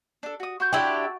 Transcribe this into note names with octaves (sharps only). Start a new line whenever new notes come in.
D4 A4
F#4 D#6
F#4 C6 G6
D4 E4 G4